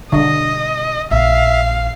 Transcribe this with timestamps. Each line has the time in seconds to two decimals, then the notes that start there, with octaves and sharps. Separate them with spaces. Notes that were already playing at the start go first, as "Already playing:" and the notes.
0.12 B2 D3 G3 D#5
1.11 A#1 E5 F5